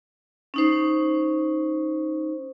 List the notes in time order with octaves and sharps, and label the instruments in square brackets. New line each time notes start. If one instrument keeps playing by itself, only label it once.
[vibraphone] C#4 D#4 C5